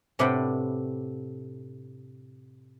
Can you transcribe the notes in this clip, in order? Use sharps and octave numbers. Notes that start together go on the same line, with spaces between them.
A2 C3 D4 B4 F#5 G5